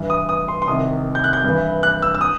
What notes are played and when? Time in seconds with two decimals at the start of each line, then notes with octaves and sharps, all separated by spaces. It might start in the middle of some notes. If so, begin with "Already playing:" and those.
Already playing: G2 E3
0.10 D#6
0.29 D#6
0.48 C6
0.62 C6
0.67 C2 C3 D#3 D#6
1.15 G6
1.24 F#6
1.33 G6
1.44 G2 E3
1.83 F#6
2.02 E6
2.15 E6
2.21 D#6